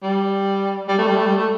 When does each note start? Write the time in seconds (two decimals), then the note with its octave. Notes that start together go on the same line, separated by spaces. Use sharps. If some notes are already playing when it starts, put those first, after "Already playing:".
0.02 G3
0.88 G3
0.98 A3
1.07 G3
1.16 A3
1.26 G3
1.36 A3